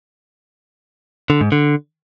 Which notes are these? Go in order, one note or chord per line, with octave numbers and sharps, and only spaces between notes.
D3
G#2
D3